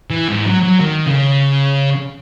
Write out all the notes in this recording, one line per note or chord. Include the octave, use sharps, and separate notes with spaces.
E3
G#2
F#3
F#3
D#3
C#3